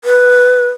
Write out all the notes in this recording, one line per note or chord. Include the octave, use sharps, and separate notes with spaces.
B4